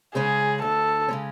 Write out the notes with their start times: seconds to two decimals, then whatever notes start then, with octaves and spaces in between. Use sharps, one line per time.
0.15 C#3 G#3 C#4 G#4
0.62 D2 A4
1.08 C#3 G#3 C#4